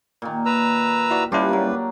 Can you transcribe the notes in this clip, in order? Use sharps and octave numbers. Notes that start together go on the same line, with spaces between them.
A#2 D#3
B4 A#5 E6
E4 F#4 D5
G3 C#4 D4 E4 F4 G4 B4
F#3 A#3